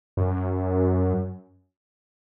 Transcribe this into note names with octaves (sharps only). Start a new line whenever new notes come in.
F#2